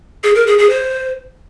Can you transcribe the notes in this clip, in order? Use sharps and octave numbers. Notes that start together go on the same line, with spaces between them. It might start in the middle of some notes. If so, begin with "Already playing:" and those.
G#4
A#4
G#4
G#4
C5